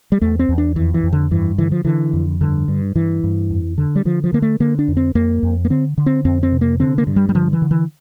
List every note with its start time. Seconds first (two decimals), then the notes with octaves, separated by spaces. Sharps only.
0.12 G3
0.22 E2 A3
0.39 C4
0.49 E2
0.58 D4
0.76 F2 E3
0.94 E3
1.04 F2
1.13 D3
1.31 G2 E3
1.58 D3 E3
1.72 F3
1.85 D3 E3
2.13 F2
2.41 G2 D3
2.68 G2
2.95 G2 E3
3.24 G2
3.50 F2
3.78 D3
3.96 G3
4.05 D3 F3
4.24 F3
4.33 D3 A#3
4.42 A3
4.60 D3 A#3
4.79 D4
4.88 F2
4.97 C4
5.15 F2 A#3
5.43 F2
5.65 A#3
5.70 D3 C4
5.98 D3
6.06 C4
6.25 F2 C4
6.43 C4
6.52 C3
6.61 A#3
6.80 D3 C4
6.98 A#3
7.07 G2
7.16 G3
7.29 G3
7.34 D3 F3
7.53 E3
7.62 D3
7.71 E3